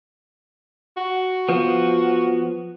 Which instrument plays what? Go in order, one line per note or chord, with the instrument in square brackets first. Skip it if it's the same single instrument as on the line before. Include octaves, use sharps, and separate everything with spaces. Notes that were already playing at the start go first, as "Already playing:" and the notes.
[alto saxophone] F#4
[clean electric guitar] F3 B3